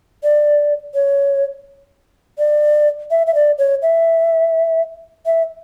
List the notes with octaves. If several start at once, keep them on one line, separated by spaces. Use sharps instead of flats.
D5
C#5
D5
E5
E5
D5
C#5
E5
E5